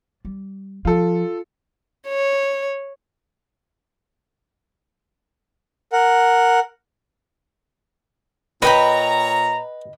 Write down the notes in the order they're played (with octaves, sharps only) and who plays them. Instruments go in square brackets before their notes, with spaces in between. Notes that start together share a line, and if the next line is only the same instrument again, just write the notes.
[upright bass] G3
[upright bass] F3 [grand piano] F4 A4
[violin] C#5
[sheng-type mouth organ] A#4 F#5
[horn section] A#2 C#5 A#5 [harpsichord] B4 [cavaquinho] D#5 G5 B5